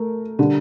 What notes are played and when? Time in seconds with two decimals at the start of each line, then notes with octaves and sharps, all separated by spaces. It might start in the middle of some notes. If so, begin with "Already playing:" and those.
Already playing: A3 A#4
0.39 D3 G3